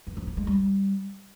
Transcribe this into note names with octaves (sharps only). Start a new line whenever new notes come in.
E3
F3
A#3
G#3
G3